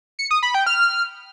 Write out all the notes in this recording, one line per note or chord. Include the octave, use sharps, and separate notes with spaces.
C#7
D#6
B5
G5
F6